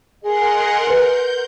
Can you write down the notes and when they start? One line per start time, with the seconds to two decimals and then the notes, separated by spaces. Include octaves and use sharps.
0.22 G#4 A#4 D#5 F#5 C6
0.87 A#4 B4 G6